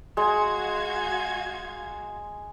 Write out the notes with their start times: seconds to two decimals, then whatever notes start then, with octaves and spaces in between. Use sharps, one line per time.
0.17 G#3 F#4 F5 G#6